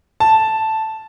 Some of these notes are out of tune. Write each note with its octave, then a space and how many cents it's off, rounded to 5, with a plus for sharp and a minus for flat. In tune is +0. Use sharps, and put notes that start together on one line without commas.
A5 +0